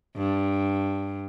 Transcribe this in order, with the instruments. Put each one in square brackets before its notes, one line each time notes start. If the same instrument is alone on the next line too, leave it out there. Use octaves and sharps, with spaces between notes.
[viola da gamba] G2